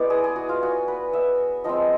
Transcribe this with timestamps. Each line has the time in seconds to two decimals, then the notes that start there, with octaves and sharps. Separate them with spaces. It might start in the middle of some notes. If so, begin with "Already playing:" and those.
Already playing: G#3 B3 E4 D5
0.10 G#4
0.24 G#4
0.36 F#4
0.49 F4
0.63 F#4
0.88 B4
1.13 E5
1.64 F3 G#3 C4 D#5